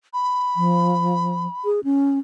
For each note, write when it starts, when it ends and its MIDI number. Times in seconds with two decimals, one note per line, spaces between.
0.13 1.69 83
0.56 1.47 53
1.65 1.80 68
1.84 2.19 61